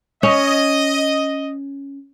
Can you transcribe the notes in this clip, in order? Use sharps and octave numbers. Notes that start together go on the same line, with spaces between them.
C#4 D#5